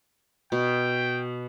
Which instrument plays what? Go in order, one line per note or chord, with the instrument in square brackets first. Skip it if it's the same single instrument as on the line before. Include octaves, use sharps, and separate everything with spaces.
[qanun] B2 [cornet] G5